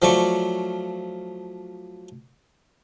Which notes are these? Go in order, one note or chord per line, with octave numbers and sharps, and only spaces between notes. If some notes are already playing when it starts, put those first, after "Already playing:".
F3 F#3 A3 D5 C#6